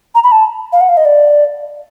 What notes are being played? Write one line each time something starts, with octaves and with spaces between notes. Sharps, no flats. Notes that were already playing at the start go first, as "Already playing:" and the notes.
A#5
B5
A5
F5
F#5
F5
D#5
D5